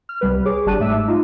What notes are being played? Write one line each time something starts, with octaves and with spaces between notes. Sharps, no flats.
F6
C2 G3 B4
G#4 C#5 D6
G1 G3 A5 F#6 D#7
G#2 A3 E5 D6 E6
D#4 F4